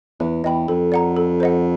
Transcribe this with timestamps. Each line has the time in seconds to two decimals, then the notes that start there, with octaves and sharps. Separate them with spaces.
0.20 E2 B4
0.44 E2 D#5 G5 B5
0.68 F2 A4
0.92 D5 F#5 A#5
1.16 A4
1.40 C5 D#5 F#5